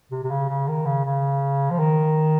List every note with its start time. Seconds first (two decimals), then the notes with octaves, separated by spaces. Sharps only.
0.11 C3
0.24 C3
0.30 C#3
0.49 C#3
0.68 D#3
0.86 C#3
1.05 C#3
1.71 F3
1.79 D#3